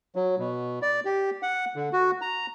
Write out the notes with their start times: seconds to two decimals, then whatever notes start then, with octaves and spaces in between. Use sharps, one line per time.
0.15 F#3
0.39 B2
0.82 D5
1.05 G4
1.42 F#5
1.76 D3
1.93 F#4
2.21 A#5